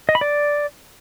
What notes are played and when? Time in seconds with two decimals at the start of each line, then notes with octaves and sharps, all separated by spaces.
0.09 D#5
0.15 B5
0.21 D5